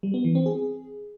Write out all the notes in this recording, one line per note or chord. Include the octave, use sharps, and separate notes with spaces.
G3
B3
E3
C4
G#4